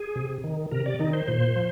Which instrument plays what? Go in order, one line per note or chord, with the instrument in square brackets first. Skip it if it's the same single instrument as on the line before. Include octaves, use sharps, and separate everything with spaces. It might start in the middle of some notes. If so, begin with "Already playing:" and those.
Already playing: [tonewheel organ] G#4
C3
D#3
C3 A#4
D5
D#3 D#4
C5
A#2 C5
F3